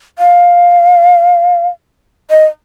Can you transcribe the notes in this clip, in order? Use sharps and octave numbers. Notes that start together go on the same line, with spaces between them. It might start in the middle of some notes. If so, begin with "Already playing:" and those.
F5
D#5